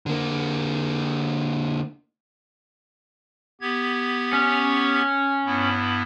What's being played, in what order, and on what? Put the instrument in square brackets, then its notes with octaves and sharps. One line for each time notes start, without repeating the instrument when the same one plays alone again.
[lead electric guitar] D3 A#3
[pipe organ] B3 G4 G#6
[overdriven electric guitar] C#4
[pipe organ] G2 B3 E4